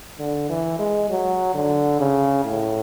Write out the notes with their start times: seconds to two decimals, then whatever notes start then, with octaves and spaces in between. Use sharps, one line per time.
0.19 D3
0.49 E3
0.79 G#3
1.09 F#3
1.55 D3
2.00 C#3
2.44 A2